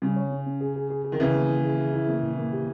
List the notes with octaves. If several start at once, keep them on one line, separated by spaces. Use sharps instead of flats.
C#3 G3
C#5
C#4
C#4
G#4
G#4
G#4
G#4
D#3
C#3 E3 G#4
A#3
A#3
G#4
G#4
E4
A#3
A#2
A#3
G4